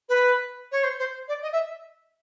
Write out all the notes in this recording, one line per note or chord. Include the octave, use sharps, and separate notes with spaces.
B4
C#5
C5
C5
D5
D#5
E5